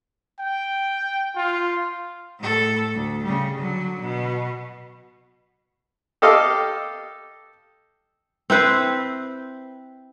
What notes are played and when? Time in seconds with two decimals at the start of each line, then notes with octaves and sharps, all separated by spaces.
0.39 G5
1.36 F4
2.39 A2 A4
2.93 D2
3.24 C#3 G3
3.58 D3 F#3
4.00 B2
6.22 G4 A4 D#5 F5 D6
8.50 C4 E4 B4 C5